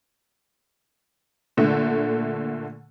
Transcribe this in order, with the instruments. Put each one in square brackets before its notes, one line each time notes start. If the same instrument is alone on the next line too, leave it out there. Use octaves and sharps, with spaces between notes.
[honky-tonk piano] A#2 D3 A3